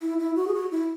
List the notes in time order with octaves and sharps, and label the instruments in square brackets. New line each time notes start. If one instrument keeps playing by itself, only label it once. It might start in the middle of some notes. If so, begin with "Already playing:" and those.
[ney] E4
E4
F#4
G#4
F#4
E4